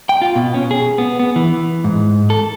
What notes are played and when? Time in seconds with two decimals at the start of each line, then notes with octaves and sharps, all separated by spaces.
0.09 G5
0.22 F4
0.36 B2
0.54 C#4
0.71 G#4
0.98 B3
1.19 B3
1.36 E3
1.84 G#2
2.30 A4